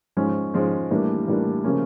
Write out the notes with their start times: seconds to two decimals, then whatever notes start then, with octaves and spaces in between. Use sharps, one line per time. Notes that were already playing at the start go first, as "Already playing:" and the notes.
0.17 G#2 F3 G#3 C#4
0.54 G#2 F3 G#3 C#4
0.91 A2 E3 G3 A#3 D4
1.28 A2 E3 G3 A#3 D4
1.64 C#3 F3 A#3 C#4